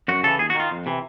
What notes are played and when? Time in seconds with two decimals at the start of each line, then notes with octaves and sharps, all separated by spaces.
0.08 F#2 F#4
0.23 C#3 E3 A4
0.39 D#2 G#4
0.50 F#4
0.55 D#3 F4
0.71 F2
0.86 C3 E3